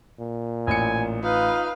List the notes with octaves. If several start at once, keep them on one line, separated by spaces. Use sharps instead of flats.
A#2
A1 G#5 C#7
D#4 F4 B4 F5